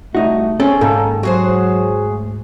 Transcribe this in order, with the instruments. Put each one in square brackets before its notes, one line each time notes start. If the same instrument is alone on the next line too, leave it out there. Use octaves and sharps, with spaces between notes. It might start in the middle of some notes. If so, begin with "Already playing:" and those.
[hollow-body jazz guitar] C2 D#4 F#4 [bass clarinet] A3
[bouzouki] C4 [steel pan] C#4 [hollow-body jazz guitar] A4
[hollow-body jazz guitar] G#2 [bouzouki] D#3 [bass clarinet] A#3 [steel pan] A4
[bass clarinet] F#3 [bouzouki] F#4 G#4 C5
[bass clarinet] D2